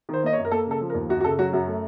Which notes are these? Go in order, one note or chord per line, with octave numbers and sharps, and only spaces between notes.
D#3 C5
A#3 D#5
C#5
F#2
A#4
A#3 A4
C#3 A4
F3
A#4
D#2
F#2 F#4
F#4
C#3 A4
F#3 F#4
F#2 F#4
A3